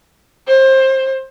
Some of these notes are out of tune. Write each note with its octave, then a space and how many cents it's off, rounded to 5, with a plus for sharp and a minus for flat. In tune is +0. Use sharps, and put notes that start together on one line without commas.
C5 +25